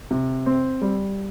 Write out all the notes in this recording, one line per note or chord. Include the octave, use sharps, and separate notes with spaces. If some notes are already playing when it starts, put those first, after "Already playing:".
C3
C4
G3